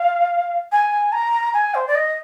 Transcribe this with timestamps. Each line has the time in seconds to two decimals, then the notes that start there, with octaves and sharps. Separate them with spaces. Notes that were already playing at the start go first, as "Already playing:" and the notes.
Already playing: F5
0.72 G#5
1.12 A#5
1.53 G#5
1.74 C5
1.87 D5
1.95 D#5